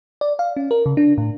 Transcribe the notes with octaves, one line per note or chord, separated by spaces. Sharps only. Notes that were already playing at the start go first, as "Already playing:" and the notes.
D5
F5
C#4
A#4
C#3
D4
A2